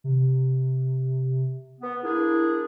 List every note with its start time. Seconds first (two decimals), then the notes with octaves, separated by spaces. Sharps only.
0.04 C3
1.81 B3
2.03 A#3 D4 E4 G#4